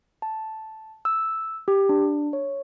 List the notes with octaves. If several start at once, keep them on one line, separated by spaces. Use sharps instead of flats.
A5
E6
G4
D4
C#5